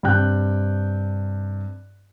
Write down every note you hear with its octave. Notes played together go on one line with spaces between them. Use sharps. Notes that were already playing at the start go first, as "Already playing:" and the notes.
G2 C3 G5 F#6 G6